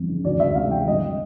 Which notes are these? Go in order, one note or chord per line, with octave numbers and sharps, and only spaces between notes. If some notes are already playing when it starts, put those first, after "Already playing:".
Already playing: G1 F2 E3
C#3
D2 D5
D2 E5
C3 F5
E3 G5
G1 D#5